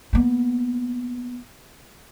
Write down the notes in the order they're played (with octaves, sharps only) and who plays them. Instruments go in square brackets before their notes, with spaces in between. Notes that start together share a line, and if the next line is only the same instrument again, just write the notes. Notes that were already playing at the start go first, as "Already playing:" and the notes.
[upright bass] A#3 B3